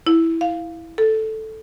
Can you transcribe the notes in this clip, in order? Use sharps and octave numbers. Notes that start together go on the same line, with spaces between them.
E4
F5
A4